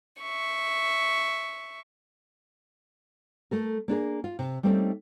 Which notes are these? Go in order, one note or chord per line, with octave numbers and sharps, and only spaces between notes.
E5 C#6
A3 A4 A#4
A#3 D4 G#4 A#4
F4
C3
G3 A3 A#3 C4 C#4 D#4